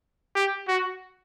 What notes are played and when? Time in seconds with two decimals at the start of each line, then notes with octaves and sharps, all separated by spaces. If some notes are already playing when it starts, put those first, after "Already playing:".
0.35 G4
0.68 F#4